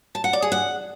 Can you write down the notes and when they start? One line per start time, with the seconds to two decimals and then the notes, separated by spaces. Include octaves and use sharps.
0.15 A5
0.24 F#5
0.33 D5
0.42 G#4
0.52 F#5